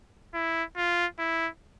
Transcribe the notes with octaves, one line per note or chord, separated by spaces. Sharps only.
E4
F4
E4